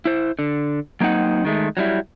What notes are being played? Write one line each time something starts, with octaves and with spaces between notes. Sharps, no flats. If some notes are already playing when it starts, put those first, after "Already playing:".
E4 C5
D3
F#3 A#3 C4 D#4 F#5
D#3 G#3 A3
F#3 G3 E4